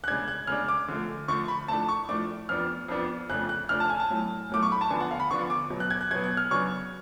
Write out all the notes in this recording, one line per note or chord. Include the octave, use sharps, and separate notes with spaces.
F#6
C#3 G#3 D4 G#6
F#6
C#3 G#3 D4 F6
D6
D3 F3 A3
D3 F3 A3 C#6
B5
A2 F3 A3 D4 A5
C#6
A2 F3 A3 D4 D6
F2 F3 B3 D4 F6
F2 F3 B3 D4
F2 C#3 F3 A3 D4 F#6
F#6
F2 C#3 F3 A3 D4 F6
A5
G#5
A5
A2 F#3 A3
A2 F#3 A3 D6
C#6
B5
A5
D3 F3 B3 D4 G#5
F#5
F5
B5
D3 F3 B3 D4 C#6
D6
B2 F#3 B3
F#6
G#6
F#6
B2 F#3 B3 G#6
F#6
F6
C#3 F#3 B3 D4 C#6